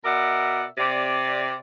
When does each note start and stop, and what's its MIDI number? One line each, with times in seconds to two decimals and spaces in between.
0.05 0.64 47
0.05 0.64 70
0.05 0.64 74
0.05 0.64 76
0.05 0.64 78
0.78 1.56 48
0.78 1.56 74